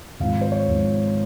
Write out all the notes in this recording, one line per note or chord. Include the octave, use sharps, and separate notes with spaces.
G#1 G#2 F3 F5
C5
C#5
G#1 G#2 F3